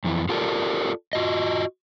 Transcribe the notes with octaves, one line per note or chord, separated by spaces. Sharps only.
F2 E3
F4 G4 A4 A#4 D5
F4 F#4 D#5